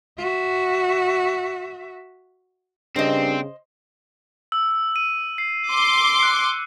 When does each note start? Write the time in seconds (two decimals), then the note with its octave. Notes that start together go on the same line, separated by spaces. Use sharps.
0.19 F#4 E5
2.96 G2 C#3 C4 C5 D#5
4.52 E6
4.96 D#7
5.38 C7
5.70 C6 D6
6.23 F#6 C#7